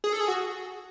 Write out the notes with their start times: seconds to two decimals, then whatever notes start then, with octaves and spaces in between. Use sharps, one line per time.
0.04 G#4
0.13 A4
0.21 G#4
0.28 F#4